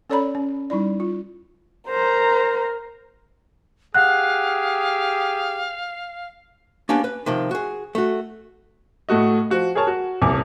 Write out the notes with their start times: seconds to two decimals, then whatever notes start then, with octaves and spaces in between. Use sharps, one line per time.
0.10 C#4 A4 C#5 D5 A#5 B5
0.35 C#4
0.70 G3 D#4 E4 D5
1.00 F4
1.89 A#4 C5 A#5
3.94 G4 G#4 F5 F#5 F#6
6.89 A#3 B3 C#4 D4 G4
7.04 B4
7.26 C3 D#3 F3
7.51 F#4 G#4
7.95 A3 F#4
9.09 A2 A3 F#4 D#5
9.50 F3 F#4 F#5
9.75 G#4 A#4 C#5 A5
9.87 F#4
10.22 D#1 C2 G#5 D6